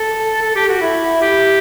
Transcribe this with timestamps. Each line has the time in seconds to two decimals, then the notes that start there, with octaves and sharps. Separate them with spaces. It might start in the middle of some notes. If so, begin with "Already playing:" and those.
Already playing: A4
0.42 A4
0.56 G4
0.69 F#4
0.81 E4
1.22 G4